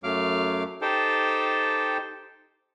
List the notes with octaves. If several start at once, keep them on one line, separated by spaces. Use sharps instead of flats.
F#2 F#3 A3 F5 D6 F6
D#4 G4 A4 C5 G5 A5